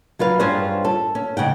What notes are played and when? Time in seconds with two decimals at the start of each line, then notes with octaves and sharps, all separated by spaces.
0.19 F#3 F4 B4 F5
0.39 G2 C#4 F4 G#4 C5 F#5
0.85 A4
1.15 C#4
1.37 G#2 C#3 F#5 G5